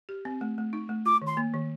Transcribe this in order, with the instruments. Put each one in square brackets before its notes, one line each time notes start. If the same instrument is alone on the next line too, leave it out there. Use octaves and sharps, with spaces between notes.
[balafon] G4
C4
A3
A3
D#4
A3
[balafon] F4 [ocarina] D6
[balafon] D#3
[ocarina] C6
[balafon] A#3
D#3